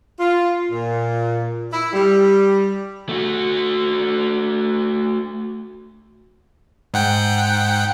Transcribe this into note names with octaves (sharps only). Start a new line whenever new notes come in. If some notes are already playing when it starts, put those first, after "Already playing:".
F4
A#2
E4
G3
A3 F#4
G#2 F#5 G5